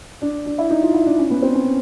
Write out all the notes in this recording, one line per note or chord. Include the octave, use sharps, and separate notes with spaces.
D4
D4
E4
D#4
F4
E4
D4
C#4
B3
C4
C#4